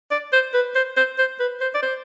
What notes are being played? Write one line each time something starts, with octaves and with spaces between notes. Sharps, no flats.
D5
C5
B4
C5
C5
C5
B4
C5
D5
C5